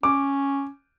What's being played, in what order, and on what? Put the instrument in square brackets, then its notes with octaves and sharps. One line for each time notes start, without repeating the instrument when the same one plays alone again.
[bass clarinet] C#4 [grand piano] D6